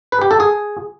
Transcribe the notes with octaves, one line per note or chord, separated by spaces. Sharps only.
B4
G4
A4
G#4